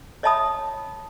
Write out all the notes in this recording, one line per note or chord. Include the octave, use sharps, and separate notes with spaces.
C#5 D#5 E5 A5 B5 D#6